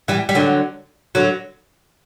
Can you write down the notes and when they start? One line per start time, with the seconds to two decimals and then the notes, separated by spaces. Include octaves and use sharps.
0.08 E3 G3
0.29 G3
0.35 D3 F#3
1.15 D3 F#3